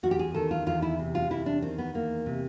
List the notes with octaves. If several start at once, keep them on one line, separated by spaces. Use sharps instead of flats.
E2 F#4
G4
G#4
D#3 A4
F4
E2 F4
E4
C3
F4
E2 E4
D4
D#3 C4
B3
E2 A#3
C3